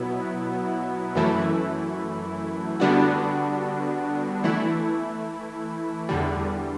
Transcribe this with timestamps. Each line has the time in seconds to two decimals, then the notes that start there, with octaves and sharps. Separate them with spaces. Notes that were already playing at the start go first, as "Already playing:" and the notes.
Already playing: B2 F#3 B3 E4
1.15 F#2 E3 A3 E4
2.80 D3 G3 B3 D4 F#4
4.44 E3 A3 E4
6.09 E2 D3 G3